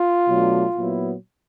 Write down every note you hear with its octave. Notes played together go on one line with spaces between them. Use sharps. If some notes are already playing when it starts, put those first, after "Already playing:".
Already playing: F4
B2 F#3 A3 D4
A#2 F#3 B3 E4